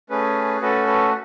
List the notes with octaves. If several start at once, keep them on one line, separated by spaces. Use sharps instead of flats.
A3 C#4 G#4 B4
A3 C#4 F#4 A4 B4
B4